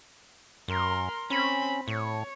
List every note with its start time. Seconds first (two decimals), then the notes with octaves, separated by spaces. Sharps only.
0.68 F#2 A#4 C6
1.30 C4 C#4 B5
1.88 A2 C#5